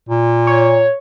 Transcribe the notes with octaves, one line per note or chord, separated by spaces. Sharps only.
A#2
C#5